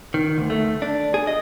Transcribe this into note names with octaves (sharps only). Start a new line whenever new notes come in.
D#3
D2
A3
D4
G#4
D#5